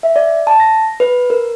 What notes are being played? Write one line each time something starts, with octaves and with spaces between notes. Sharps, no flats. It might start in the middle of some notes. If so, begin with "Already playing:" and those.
E5
D5
A5
A#6
B4
A#4